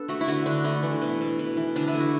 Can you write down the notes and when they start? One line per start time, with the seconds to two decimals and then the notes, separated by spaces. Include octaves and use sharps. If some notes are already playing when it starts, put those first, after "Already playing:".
Already playing: B3 D4 A4
0.08 A3 F#4
0.21 E4
0.28 D3 F#4
0.46 D3 D4
0.64 A3 E4
0.83 E3
1.01 B2
1.21 B2
1.39 E3
1.57 E3
1.76 D3 D4
1.88 E4
1.94 A3
2.00 F#4